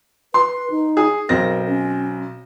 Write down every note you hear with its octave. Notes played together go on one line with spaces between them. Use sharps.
B4 C6
D#4
G#4
B1 C4 A#4 A#6
C#4